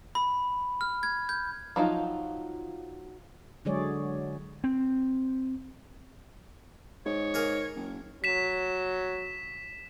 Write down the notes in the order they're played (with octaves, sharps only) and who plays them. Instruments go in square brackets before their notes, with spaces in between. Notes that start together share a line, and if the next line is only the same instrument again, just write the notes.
[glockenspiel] B5
F6
G#6
G6
[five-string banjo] F3 F#3 D#4 F4
[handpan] D3 F#3 G#3 G#4 C#5 D5
[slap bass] C4
[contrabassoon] G#2 [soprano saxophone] C#5
[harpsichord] A#3 G#4 A#4
[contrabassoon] F#1
[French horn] F#3 [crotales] B6 E7